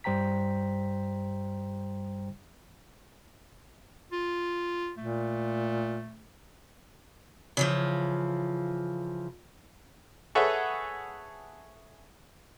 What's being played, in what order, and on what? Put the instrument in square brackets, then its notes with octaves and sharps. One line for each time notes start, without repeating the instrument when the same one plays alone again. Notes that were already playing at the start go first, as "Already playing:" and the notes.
[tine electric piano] G2 G3 C5 G5 A#5 B6
[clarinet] F4
[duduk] A#2 [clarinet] A3
[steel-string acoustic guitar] C#3 E3 F3
[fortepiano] G#4 A4 B4 C#5 E5 F#5